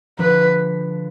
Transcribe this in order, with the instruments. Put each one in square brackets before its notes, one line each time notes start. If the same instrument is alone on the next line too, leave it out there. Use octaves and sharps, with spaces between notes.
[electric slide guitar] D3 F3 [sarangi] B4